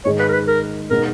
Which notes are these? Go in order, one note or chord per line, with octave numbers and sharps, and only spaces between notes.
G#2 D#3 G#3 C#5
B4
A#4
B4
A#4
B2 G#3 B3 D#4 A#4